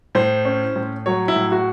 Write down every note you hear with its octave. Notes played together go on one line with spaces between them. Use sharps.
A2 C5
C#4
A2
F#3 C#5
E4
A2
F#4